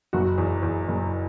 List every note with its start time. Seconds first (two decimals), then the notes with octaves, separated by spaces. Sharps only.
0.13 F#1 F#4
0.38 E2
0.63 E2
0.88 F#1